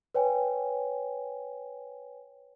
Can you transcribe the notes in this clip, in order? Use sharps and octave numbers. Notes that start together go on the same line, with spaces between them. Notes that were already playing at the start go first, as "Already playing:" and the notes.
B4 C#5 G5 G#5